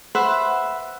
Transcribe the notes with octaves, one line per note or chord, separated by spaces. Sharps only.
B4 C5 E5 F#5